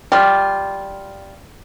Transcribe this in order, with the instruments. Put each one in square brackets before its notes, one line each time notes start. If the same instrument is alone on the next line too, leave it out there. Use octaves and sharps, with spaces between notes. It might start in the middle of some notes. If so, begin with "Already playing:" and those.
[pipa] G3 F4